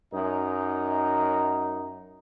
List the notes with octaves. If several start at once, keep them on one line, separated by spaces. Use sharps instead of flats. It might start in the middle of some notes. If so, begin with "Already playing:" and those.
F#2 D#4